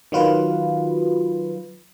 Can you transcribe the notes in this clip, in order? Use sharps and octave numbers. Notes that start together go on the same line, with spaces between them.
D#3 F#3 F4 B4